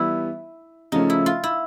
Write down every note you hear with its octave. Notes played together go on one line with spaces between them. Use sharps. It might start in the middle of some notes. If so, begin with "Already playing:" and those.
Already playing: E3 G3 B3 E4
C#3 F3 A3 C#4 D#4
E4
F4
E4